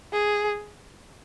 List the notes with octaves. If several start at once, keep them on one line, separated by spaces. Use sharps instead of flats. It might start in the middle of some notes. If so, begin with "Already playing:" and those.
G#4